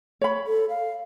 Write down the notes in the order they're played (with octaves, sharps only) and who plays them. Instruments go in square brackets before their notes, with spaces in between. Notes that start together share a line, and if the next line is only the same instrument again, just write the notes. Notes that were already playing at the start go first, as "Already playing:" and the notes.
[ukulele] C#5 B5
[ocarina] A4
F5